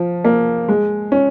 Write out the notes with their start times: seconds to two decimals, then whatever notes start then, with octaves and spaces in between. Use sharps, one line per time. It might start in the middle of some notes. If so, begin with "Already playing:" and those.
Already playing: F3
0.25 A#3
0.69 G#3
1.12 C#4